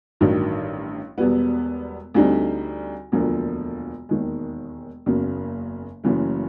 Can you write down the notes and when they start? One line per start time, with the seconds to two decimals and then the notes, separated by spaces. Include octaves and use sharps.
0.21 A1 G2 D#3 F#3
1.18 E1 E2 B2 G3 B3
2.15 D2 D3 G3 C4 D#4
3.12 E1 D2 D3 F3 A#3
4.09 E1 D#2 D#3 G#3
5.06 F#1 E2 C#3 F#3 A#3
6.04 F#1 F#2 C#3 E3 A3